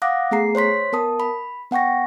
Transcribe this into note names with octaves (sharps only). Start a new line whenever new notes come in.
F5 F#5 D6 D#6 F#6 A#6
A3 B3 G#4 A#5 C7
C5 C#5 C6 B6
B3 A#4 A5 D#6
B5
B3 F#5 G5 C#6 A#6